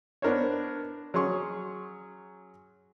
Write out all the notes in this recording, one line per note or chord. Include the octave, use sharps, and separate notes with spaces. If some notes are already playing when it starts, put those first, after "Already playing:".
B3 D4 A#4 C5 C#5
F#3 C#4 G#4 C6 C#6